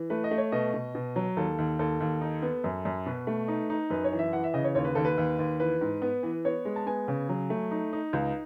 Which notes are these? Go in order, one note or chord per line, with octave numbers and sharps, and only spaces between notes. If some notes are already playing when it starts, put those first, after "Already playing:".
Already playing: E3
A3 B4
D#5
A3
C#5
B2 D#5
B2
B2
F#3
D#2 A4
D#2
D#2 A4
D#2
D#4
B3
F#2
F#2
B2 B4
A3
D#4
D#4
F#2 B4
C#5
E3
E5
E3 F#5
E5
C#3 D#5
C#5
D#2 C#5
B4
D#2 A4
B4
D#2
D#2
E3 B4
G#2
B3
E3
B3 C#5
G#3
A5
B3 G#5
C#3
F#3
A3
D#4
D#4
C#2